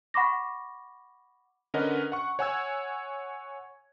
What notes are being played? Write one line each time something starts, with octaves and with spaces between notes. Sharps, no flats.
F#5 B5 C#6 D6 A#6
D3 C#4 A#4 B4 D#5 F#5
F#5 C#6
C#5 F#5 G#5 C#6 E6 G#6